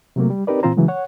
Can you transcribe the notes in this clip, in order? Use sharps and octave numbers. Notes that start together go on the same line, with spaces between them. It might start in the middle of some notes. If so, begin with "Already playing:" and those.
C3 F#3 A3 A#3
G3
C4 D#4 G4 A#4 B4 D5
A#2 E3 C4 F4 C5 A#5
C#3 E3 F#3 G#3
C#5 F#5